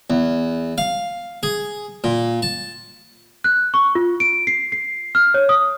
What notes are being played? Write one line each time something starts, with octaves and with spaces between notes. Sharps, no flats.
E2
F5
G#4
A#2
A5
F#6
C#6
F4
D7
C7
C7
F6
C#5
D#6